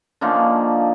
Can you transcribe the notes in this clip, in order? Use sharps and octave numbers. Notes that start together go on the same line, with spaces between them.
D3 F3 A#3 C#4 D#4